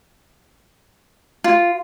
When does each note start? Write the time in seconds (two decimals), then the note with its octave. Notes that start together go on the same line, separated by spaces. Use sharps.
1.44 F4